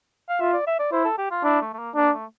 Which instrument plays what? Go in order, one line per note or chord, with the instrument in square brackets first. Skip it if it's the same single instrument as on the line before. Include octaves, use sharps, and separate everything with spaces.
[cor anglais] F5
[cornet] F4 [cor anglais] E5
[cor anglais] D5
E5
D5
[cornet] E4 [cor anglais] C5
[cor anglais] A4
G4
F4
[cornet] D4 [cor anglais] E4
[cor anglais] A3
A3
A#3
[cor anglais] A#3 [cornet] D4
[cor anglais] A3